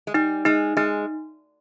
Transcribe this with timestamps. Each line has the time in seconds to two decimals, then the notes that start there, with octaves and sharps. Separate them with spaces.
0.07 G#3
0.14 G3 D#4
0.45 G#3 D#4
0.77 G#3 D#4